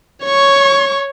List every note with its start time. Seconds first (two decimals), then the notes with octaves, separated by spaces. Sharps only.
0.24 C#5 C#6